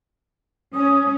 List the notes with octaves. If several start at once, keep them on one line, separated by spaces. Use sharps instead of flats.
C#4 D#6